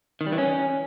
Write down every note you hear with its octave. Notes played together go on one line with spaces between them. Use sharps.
D#3
G3
E3
C#4